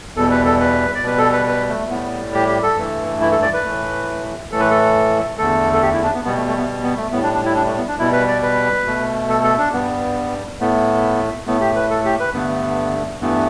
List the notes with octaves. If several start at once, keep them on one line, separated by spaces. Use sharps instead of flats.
E2 B2 G3 A4
B4
A4
B4
D5
B2 G3 B4
A4
B4
B4
A3
A2 G3 B3
G4
G4
A4
G2 E3 A3
E4
A4
D5
B4
A2 E3 A3
A2 E3 A3 A4
B4
A4
E2 D3 A3 A4
A4
G4
E4
D4
B3
B2 G3 B3
A3
A3
B3
B3
A3
A2 G3 B3
D4
D4
E4
D4
A3
B3
D4
B2 G3 E4
B4
D5
B4
B2 A3
A4
A4
D4
G2 G3 B3
A2 A3 B3
A2 A3 B3
G4
B4
A4
G4
B4
G2 D3 A3 B3
G2 E3 A3 B3